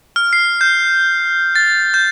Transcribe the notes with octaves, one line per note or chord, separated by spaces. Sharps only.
F6
C7
G6
A6
G6